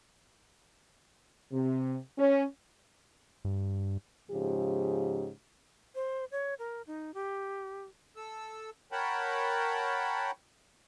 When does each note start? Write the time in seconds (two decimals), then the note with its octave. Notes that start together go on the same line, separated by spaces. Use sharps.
1.53 C3
2.18 C#4
3.45 G2
4.30 G#2 C#3 F3 G4
5.95 C5
6.31 C#5
6.59 A#4
6.87 D#4
7.14 G4
8.17 A4 E6
8.92 A#4 C#5 F#5 G5 A5 B5